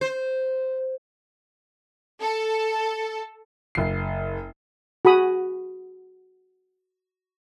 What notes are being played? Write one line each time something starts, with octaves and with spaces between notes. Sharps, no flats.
C5
A4
F#1 C7
F#4 G#4 B5 D#6